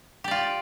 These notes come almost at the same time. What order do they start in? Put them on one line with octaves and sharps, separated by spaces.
G4 D5 F4